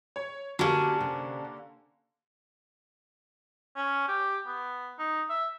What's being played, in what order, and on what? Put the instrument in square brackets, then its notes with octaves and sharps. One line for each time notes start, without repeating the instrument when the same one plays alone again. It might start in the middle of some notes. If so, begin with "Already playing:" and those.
[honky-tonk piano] C#5
[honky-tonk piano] D3 A#3 [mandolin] C#4 D4 [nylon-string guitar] F#4 G4 A5
[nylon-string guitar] C3
[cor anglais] C#4
G4
B3
D#4
E5